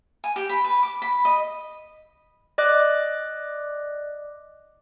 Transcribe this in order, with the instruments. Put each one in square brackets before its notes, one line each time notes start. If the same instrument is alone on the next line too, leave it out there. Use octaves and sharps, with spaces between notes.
[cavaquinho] G#5
G4
B5
B4
D6
B5
D#5
[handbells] D5 D#5 D6 F#6